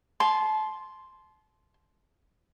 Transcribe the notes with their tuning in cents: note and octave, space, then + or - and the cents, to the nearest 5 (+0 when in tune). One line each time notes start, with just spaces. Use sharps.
A5 -30 C6 +0